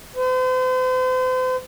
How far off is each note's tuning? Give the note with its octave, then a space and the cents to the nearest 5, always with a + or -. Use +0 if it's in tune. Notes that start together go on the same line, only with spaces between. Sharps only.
C5 -40